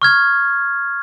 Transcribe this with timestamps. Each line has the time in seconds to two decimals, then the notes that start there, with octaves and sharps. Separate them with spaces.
0.02 C#6 F6 G#6